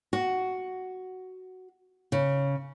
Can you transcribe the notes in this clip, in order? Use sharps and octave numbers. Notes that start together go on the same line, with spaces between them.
F#4
C#3